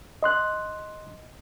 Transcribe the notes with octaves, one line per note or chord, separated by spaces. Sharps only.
D#5 C6 F#6